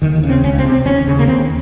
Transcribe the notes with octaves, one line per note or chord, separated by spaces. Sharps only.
D#2 D#3
D#3
C#3
C4
C#2 C#4
C4
C3
C4
D#2 C#4
C#3
A#3
D#2 C4